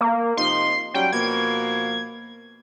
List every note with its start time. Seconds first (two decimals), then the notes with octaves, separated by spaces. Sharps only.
0.01 A#3
0.37 C3 F3 D#4 C6
0.94 F#3 G3 C#4 G5
1.13 B2 F3 A#3 G#6